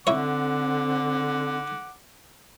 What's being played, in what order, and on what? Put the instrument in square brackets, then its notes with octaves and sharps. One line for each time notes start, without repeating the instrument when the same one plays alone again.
[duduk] D3 [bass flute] C4 [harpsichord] E4 C#5 [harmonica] F#5 D6